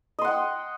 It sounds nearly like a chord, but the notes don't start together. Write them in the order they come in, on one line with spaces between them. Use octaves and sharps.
D#5 C6 F#5 G5